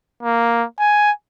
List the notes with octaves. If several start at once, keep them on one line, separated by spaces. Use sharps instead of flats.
A#3
G#5